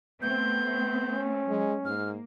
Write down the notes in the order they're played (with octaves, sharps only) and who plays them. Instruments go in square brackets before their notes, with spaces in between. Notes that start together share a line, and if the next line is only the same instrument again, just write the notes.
[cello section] A3 C4 [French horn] B3 [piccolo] G6
[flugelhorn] C#4
[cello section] F#3 [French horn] G#3
[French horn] G#2 [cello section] A#3 [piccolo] F6